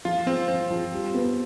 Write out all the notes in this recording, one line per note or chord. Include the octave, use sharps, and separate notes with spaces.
F3 F4
F3 C4
F3 C4
F3
G3
B3